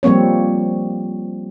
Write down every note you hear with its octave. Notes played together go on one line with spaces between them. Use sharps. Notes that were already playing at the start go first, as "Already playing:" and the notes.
F3 G3 A#3 C4 C#5